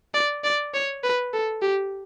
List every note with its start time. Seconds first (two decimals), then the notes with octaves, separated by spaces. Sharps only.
0.14 D5
0.44 D5
0.74 C#5
1.03 B4
1.33 A4
1.62 G4